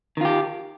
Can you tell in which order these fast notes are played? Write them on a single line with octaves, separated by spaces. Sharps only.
D#3 F4 G4